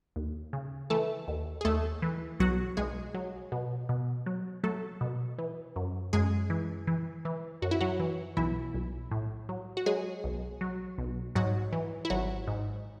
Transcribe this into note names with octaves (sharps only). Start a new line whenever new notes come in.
D#2
C#3
E3 A3 A4
D#2
G#4
D#2 A3 A4
E3
B1 F#3 F#4
B1 G#3 G#4
F#3
B2
B2
F#3
F#3 A3 A4
B2
E3
F#2
F#2 G#3 G#4
E3
E3
E3
F#2 F#4
E4
F#3 F#4
E3
B1 E3 E4
B1
A2
F#3
F#4
F#3 G#3 G#4
B1
F#3
B1
G#2 F#3 F#4
E3
E4
G#1 F#3 F#4
G#2